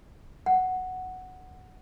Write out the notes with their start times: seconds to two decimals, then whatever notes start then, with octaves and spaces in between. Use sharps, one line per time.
0.46 F#5